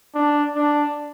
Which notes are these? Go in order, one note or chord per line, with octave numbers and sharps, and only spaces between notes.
D4
D4